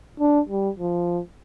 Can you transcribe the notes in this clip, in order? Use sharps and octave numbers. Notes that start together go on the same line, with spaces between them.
D4
G3
F3